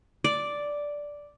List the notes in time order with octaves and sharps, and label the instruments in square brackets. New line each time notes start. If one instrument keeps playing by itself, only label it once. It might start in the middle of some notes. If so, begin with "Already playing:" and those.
[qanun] D5